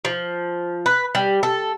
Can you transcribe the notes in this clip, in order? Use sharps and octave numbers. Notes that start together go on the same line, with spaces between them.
F3
B4
G3
A4